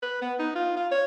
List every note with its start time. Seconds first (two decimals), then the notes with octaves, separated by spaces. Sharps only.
0.03 B4
0.22 B3
0.39 D#4
0.55 F4
0.76 F4
0.91 C#5